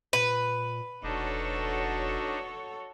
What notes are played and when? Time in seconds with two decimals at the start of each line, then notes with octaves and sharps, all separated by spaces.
0.13 A#2 B4
1.03 E1 D4 D#4 F#4 A4 C#5